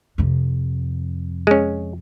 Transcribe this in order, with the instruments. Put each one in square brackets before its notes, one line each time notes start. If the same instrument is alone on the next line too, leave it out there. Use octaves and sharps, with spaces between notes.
[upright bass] F2 C3
[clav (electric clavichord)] G#3 C#4